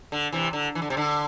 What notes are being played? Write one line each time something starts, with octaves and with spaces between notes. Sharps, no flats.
D3
C3 E3
D3
E3
D3
C3
D3